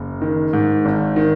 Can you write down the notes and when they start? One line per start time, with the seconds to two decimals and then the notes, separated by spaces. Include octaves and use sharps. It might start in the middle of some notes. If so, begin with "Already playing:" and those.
Already playing: F#1
0.22 D#3
0.53 G#2
0.85 G#1
1.16 D#3